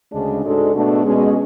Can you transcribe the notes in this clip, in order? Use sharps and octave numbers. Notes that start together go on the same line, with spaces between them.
D2 C#3 G#3 D4
G#2 G#3 D4 F#4 A4
B2 A3 D4 F#4 A4
B2 G#3 C#4